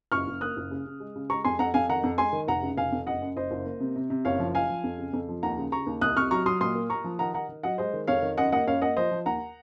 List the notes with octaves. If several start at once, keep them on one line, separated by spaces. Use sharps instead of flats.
F#1 C#6 F6
F#1
A#3 D#6 F#6
F#1
C#3
C#3
G#3
C#3
G#3 A#5 C#6
F2 G#5 C6
F2 F#5 A#5
F2 F5 G#5
D#3 F#5 A#5
F2
G#3 G#5 C6
D#3
F1 F#5 A#5
C#3
F1 F5 G#5
F2
F#1 D#5 F#5
F#2
F#1 C5 D#5
F#1
A#3
C3
C3
C3
F#1 C#5 F5
F3
F3 F5 G#5
F3
F2
C#3
F2
F3
D#2 F#5 A#5
C#3
C#3 A#5 C#6
D#2
C2 D#6 F#6
C3 C#6 F6
F#3 A#5 C#6
F#3 C6 D#6
A#2 C6 D#6
A#3
A#3 A#5 C#6
F3
D#3 F#5 A#5
D#3 F#5 A#5
D#3
F#3 D#5 F#5
G#3 C5 D#5
D#3
F2 C#5 F5
D#3
F#2 D#5 F#5
A#3 D#5 F#5
F#2 C#5 F5
A#3 D#5 F#5
F3 C5 D#5
F3
D#2 F#5 A#5